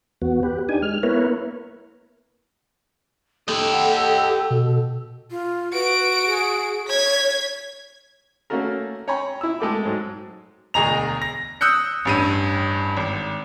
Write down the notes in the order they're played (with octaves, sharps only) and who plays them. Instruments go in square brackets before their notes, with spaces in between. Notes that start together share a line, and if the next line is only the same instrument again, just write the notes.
[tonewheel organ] E2 B3 F#4
G4 B4
D4 D#4 G4 G#5
G#3 F6
A#3 B3 E4 A#4 B4 C#5
[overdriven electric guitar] G4 D#5 [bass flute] A4
[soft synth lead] F#5
B2
[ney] F4
[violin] F#4 D7 [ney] B4
[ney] G#4
[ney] C#5 [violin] G#6 B6
[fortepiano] A3 A#3 C#4 F#4 A4 A#4
C#5 G5 G#5 A#5 B5 C#6
E4 E6
G#3 A3 A4 G5 D6
G#2 F#3
[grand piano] E1 D2 G#4 D#5 A#5 F7
A#6
D#6 E6 F#6 G6 C#7
A1 G2 D#7
G#1